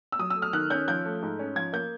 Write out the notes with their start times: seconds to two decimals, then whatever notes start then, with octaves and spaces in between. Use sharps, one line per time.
0.12 E6
0.19 F#3 D#6
0.30 E6
0.36 A3
0.42 F6
0.53 D#3 F#6
0.70 C#4 G6
0.88 F3 G6
1.05 A3
1.22 G#2
1.39 C#4
1.56 F3 G#6
1.73 A#3 G6